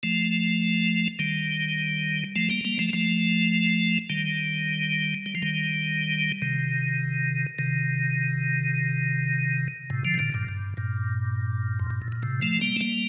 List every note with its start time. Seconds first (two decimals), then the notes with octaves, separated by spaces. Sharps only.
0.03 F3 A3
1.19 D#3 G3
2.36 F3 A3
2.50 G3 A#3
2.65 G3 A#3
2.79 F3 A3
2.93 F3 A3
4.10 D#3 G3
5.26 G3
5.35 F3
5.42 D#3 G3
6.42 C3 D#3
7.59 C3 D#3
9.90 A2 C3
10.05 D3 F3
10.14 C3
10.19 A#2 D3
10.34 G2 A#2
10.48 G2
10.77 G2 A#2
11.80 F2
11.90 G2
12.02 A2
12.12 A#2
12.22 A2 C3
12.42 F3 A3
12.61 G3 A#3
12.76 A3
12.81 G3 A#3